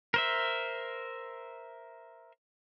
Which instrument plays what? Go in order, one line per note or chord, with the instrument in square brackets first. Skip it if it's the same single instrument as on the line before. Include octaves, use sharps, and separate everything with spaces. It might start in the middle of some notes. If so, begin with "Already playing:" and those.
[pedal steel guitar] A#4 C5 E5